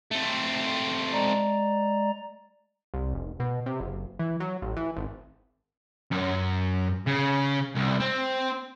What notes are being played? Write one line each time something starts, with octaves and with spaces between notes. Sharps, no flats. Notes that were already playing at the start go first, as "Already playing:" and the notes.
A3 C4
G#3 D5 A#5
C2
F1
B2
C3
F#1
E3
F#3
A1
E3
G#1
F#2
C#3
C2
C4